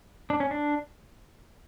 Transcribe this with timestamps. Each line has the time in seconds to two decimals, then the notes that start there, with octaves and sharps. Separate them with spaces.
0.30 D4
0.40 C#4
0.51 D4